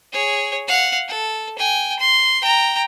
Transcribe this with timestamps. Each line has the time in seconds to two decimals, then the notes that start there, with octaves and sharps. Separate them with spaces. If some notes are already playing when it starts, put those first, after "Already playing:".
0.12 G#4 C#5
0.68 F5 F#5
1.08 A4
1.58 G5 G#5
1.99 C6
2.42 G5 A#5